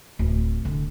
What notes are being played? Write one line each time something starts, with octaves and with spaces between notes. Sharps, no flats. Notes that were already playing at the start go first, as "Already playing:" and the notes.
D1
D3